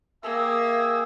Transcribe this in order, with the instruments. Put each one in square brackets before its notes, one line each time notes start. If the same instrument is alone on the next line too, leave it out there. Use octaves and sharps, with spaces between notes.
[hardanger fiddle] A#3 [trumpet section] G#4 E5 G5